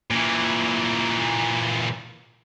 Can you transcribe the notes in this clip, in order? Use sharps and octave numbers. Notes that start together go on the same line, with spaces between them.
A#2 E3